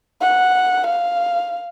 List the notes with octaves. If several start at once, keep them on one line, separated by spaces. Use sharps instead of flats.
F#5
F5